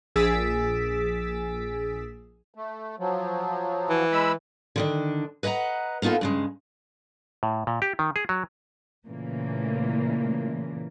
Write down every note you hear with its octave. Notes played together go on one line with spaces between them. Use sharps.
A#1 G#4 E6 A6 B6 D7
A3
F3 F#3
E3
G#3 B5 E6
D3 D#3 D4
B4 D#5 F#5 G5 A#5
A#3 B3 D#4 F4 A4
G2 C#3 G#3
A2
A#2
G4
D#3
G#4
F#3
A#2 C#3 E3 A3 A#3